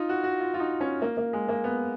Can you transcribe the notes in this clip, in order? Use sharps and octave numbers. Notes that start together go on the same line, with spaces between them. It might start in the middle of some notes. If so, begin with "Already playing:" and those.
Already playing: D#4 F4
F#4
F#4
F4
F4
D#4
C#4
A#3
A#3
G#3
A#3
B3